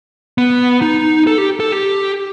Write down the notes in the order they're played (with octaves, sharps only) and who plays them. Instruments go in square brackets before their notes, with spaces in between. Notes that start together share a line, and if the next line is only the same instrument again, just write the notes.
[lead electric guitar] B3
D#4
A4
G4
A4
G4